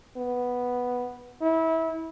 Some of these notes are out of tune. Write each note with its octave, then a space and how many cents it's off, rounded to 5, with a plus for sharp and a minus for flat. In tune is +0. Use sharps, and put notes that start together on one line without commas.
B3 +0
E4 -25